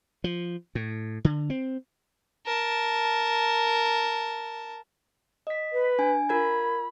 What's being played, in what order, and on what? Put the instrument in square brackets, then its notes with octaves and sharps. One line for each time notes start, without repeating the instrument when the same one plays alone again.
[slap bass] F3
A2
D3
C4
[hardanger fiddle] A#4 A5
[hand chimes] D#5 B6
[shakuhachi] B4
[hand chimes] D4 G#5
[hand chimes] F4 A#4 G#6 [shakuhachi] B5